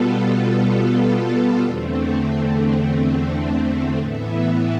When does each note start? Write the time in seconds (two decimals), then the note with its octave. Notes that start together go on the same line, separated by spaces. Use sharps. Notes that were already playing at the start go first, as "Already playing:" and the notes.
Already playing: B2 G3 B3 F4 A4
1.62 E2 D3 A3 C4
3.97 A2 E3 B3 E4